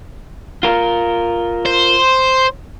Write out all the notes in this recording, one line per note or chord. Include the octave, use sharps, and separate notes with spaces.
F4 A#4
C5